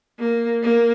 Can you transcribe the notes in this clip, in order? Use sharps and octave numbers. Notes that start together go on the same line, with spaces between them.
A#3
A#3